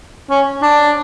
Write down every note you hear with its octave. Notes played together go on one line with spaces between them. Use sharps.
C#4
D4